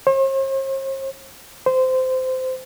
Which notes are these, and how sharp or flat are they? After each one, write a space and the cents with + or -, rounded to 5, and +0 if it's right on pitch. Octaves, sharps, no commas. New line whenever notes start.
C5 +45
C5 -20